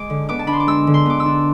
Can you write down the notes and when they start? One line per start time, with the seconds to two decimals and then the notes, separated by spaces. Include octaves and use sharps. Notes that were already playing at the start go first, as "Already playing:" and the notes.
Already playing: G#3 D6
0.10 D3
0.29 B3 D6
0.39 A5
0.47 D4 B5
0.53 C6
0.60 D6
0.67 G#3 E6
0.87 D3
0.94 C6
1.06 B3 D6
1.20 E6
1.26 D4